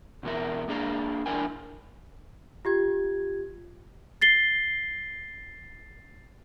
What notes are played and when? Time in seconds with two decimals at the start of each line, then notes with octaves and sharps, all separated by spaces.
0.23 B2 E3 B3 E4 A#4
0.68 A#3 D4 G#4 A4 F5 A#5
1.26 F2 D4 E4 A#4 G5 G#5
2.65 F4 G4 G#6
4.21 A6 C7 G7